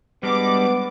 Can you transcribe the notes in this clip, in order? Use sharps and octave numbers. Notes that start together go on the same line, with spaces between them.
G3 G#3 B3 D4 D6